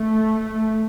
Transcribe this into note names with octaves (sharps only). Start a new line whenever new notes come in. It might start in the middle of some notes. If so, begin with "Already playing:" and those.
Already playing: A3